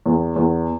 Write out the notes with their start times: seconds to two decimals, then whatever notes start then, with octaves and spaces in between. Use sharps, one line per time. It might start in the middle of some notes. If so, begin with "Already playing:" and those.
0.06 E2
0.36 E2